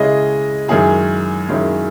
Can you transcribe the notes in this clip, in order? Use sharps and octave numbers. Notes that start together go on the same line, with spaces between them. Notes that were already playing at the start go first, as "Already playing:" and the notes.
Already playing: C#3 G#3 C#4 E4 D#5
F#2 D#3 G#3 C#4 E4 G#4
F#2 D#3 G#3 C#4 E4